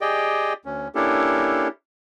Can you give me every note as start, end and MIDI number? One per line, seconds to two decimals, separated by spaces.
0.01 0.53 67
0.01 0.53 68
0.01 0.53 74
0.01 0.53 75
0.01 0.53 79
0.65 0.88 38
0.65 0.88 61
0.95 1.68 58
0.95 1.68 61
0.95 1.68 62
0.95 1.68 64
0.95 1.68 67
0.95 1.68 69